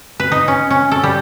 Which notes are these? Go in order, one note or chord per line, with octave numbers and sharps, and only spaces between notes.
B4
D#4
C#4
C#4
A4
G3